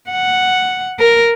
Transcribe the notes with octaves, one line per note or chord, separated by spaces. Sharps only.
F#5
A#4